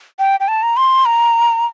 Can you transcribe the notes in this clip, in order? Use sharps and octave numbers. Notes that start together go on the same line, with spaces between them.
G5
G5
A5
A#5
C6
A#5